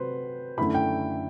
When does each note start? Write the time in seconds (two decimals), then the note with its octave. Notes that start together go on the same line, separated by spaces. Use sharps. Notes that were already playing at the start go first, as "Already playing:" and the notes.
Already playing: C3 F#3 B4 C5
0.58 F#2 D3 A3 E4 B5
0.75 G5